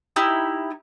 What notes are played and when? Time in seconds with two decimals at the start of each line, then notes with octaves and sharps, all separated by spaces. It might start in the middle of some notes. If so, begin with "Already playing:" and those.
0.16 D#4 E4 G4